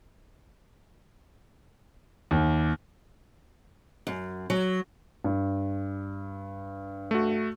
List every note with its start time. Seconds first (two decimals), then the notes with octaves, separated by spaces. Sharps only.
2.31 D#2
4.07 F#2
4.50 F#3
5.24 G2
7.11 A3 F#4